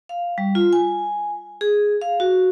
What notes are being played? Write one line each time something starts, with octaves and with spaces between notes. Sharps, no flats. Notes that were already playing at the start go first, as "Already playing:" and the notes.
F5
G3
F4
G#5
G#4
F5
F#4